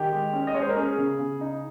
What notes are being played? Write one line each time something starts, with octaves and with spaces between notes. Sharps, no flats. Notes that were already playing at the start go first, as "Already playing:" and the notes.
Already playing: D#3 G4
G#3
C#4
D#5
G#3 C#5
C5
A#4
C#4 G#4
C#3
C#3
D#4